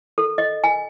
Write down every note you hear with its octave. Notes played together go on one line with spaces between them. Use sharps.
A4
D#5
G#5